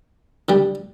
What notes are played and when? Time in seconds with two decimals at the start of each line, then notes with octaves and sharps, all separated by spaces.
0.49 D3 G3